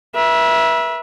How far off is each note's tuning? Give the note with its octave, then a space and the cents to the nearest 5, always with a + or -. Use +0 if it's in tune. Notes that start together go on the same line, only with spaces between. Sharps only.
B4 -40 E5 +0